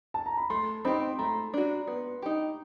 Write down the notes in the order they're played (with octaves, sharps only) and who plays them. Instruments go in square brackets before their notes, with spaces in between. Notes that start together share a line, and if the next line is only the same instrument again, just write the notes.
[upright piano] A5
A#5
B5
[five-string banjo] A3 [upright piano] C6
[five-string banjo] C4 D#4 G4 [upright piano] B5
[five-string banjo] A3 [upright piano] A#5
[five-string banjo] D4 F#4
B3
D#4 G4